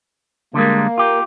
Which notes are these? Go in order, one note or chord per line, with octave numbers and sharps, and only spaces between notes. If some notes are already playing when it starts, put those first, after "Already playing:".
D3 G3 G#3 A#3
F4 G4